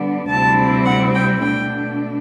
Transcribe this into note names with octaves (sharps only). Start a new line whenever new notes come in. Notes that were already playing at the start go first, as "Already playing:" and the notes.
Already playing: D3 G3 B3 D4
D2 C3 G3 C4 E4 A5
F#5
G5
B2 A3 D4 G5